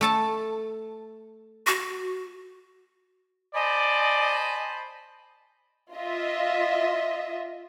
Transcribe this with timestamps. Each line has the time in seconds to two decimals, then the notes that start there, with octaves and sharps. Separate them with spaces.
0.01 A3 A4 A5
1.67 F#4
3.55 C5 D5 D#5 G#5 A5 B5
5.94 F4 D#5 E5